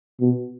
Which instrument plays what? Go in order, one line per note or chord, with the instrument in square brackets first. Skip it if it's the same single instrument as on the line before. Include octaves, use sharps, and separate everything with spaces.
[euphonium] B2